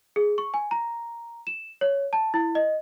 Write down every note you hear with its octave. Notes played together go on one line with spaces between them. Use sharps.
G#4
C#6
G#5
A#5
E7
C#5
A5
E4
D#5